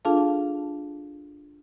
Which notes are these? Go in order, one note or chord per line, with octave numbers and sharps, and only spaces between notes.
D4 F4 G#4 A4 F5 A5